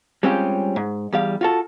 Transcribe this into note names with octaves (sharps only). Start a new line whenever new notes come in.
G3 G#3 C4 C#4 F4 G4
G#2
E2 G3 F5
F4 F#4 A4